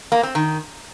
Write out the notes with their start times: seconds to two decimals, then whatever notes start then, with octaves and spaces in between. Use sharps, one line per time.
0.12 A#3
0.23 C4
0.35 D#3